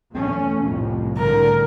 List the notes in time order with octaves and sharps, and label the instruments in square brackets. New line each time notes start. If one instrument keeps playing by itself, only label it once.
[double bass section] E2 A3 C#4
C2 F2 A2
[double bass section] A2 D3 [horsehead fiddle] A#4